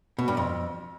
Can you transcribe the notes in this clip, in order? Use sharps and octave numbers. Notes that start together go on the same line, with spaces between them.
B2
G2
F2